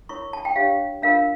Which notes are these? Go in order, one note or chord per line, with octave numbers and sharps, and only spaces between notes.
E4 A#4 C#5 C#6
A5
G5
D4 G4 C#5 F5
D4 F4 A#4 F5